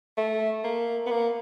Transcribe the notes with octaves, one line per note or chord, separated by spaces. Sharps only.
A3
A#3
B3
A#3